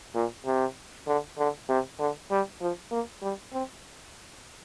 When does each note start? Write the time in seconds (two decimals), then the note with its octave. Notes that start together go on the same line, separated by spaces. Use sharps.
0.15 A#2
0.46 C3
1.07 D3
1.38 D3
1.69 C3
2.00 D3
2.31 G3
2.61 F3
2.91 A#3
3.22 G3
3.53 C4